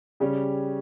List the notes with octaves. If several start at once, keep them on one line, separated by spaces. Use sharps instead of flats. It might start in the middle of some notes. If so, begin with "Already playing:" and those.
C#3 G3 C#4 G4